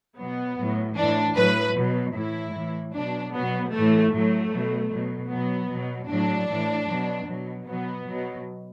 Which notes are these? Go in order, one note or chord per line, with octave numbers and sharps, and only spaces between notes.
B2 F#3 B3
A2 F#3
A2 E3 D4
A2 F#3 B4
B2 F#3
A2 E3 E4
A2 E3
B2 F#3 D4
B2 F#3 B3
A2 E3 A3
A2 F#3 A3
B2 F#3
B2 F#3
B2 F#3 B3
B2 F#3
A2 F#3 D4
A2 E3
B2 F#3
B2 F#3
B2 F#3 B3
B2 F#3